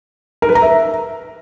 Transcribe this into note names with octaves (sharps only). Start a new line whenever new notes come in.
A#4
B4
A#5
E5